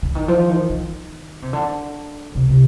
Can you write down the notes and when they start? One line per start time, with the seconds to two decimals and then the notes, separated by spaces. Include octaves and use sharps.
0.03 D3
0.15 D#3
0.28 F3
0.49 D#3
0.70 D#3
1.42 C3
1.53 D3
2.35 C3
2.49 C3